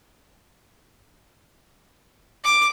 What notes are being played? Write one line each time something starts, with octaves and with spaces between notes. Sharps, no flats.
D6